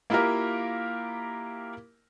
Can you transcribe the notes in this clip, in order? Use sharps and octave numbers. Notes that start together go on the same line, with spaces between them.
A#3 E4 F4 G4 A#4